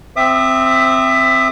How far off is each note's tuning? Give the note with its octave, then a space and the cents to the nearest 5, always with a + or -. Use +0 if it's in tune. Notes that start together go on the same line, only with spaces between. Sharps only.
C4 +0 E5 +10 D#6 -45